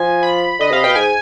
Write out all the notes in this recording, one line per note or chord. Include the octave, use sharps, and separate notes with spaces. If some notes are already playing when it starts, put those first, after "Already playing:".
Already playing: F3 G#5
B5
D3 D#5
C3 F5
B2 G5
G#2 G#5